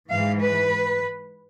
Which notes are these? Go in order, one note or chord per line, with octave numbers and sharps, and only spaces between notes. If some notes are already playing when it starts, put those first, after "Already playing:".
G#2 E3 G#3 F5
B4